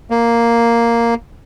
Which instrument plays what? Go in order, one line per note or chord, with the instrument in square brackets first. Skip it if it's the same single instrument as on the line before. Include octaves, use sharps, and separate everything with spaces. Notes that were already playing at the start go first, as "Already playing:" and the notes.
[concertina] A#3